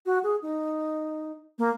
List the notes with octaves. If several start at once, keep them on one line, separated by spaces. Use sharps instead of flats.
F#4
G#4
D#4
A#3